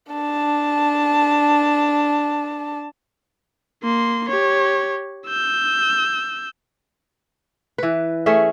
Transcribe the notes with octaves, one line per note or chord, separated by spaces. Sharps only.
D4 A5
A#3 C6
G4 C#5
E6 G6
E3 B4
A3 C#4 G#4 E5